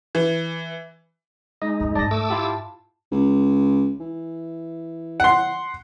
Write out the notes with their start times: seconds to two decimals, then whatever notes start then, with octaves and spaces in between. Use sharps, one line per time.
0.15 E3
1.62 G#3 D#4 D#5
1.80 D1 C#2
1.95 G#2 C4 D5 A5 A#6
2.11 A3 D6 E6
2.30 E4 F4 G4
3.12 C#2
4.00 E3
5.20 F#5 C6